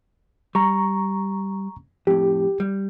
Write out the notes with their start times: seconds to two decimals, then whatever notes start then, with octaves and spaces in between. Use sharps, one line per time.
0.55 G3 A#5 C#6
2.07 F2 A2 G4
2.60 G3